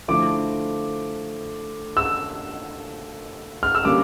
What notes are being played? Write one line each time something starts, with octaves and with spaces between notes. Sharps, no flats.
D3 F3 A3 E4 D6
E6
F6
E6
D3 G3 A#3 C#4 D6